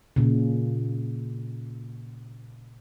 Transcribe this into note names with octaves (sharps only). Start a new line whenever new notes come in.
A#2 C#3